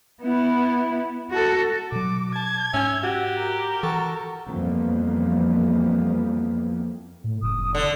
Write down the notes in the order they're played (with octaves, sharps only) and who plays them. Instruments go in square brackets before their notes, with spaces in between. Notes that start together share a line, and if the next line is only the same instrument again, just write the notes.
[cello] B3 E4
F#4 A4
[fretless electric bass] B2 F#3 [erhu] D6
[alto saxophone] A5 [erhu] G#6
[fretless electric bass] G#2 [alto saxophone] C#4 [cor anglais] E5
[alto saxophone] F#4 [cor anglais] G4
[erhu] A#4
[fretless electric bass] E3 [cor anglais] F#4 [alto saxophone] A4
[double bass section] F2 E3 F3 G3 A#3 B3
[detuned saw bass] A2
[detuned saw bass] F#1 [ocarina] D#6
[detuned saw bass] F1
[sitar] D3 [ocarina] D5